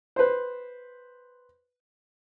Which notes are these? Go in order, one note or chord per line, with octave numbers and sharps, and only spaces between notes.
B4 C5